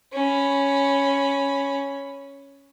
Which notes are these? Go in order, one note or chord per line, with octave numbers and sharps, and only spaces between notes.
C#4 B5